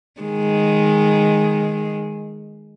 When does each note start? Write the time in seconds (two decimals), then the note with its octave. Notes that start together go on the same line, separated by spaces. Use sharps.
0.21 D#3 G#3